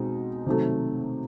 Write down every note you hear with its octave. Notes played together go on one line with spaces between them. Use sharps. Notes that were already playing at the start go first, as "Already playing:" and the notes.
Already playing: B2 G#3 C4 D#4
C3 D#3 F#3 A3